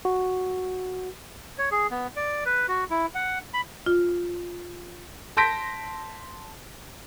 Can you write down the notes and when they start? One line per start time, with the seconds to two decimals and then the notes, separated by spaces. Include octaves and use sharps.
0.05 F#4
1.58 C#5
1.72 G#4
1.91 B3
2.16 D5
2.45 B4
2.68 F#4
2.90 E4
3.15 F#5
3.54 B5
3.86 F4
5.37 A5 C6 G6 A#6 B6 D7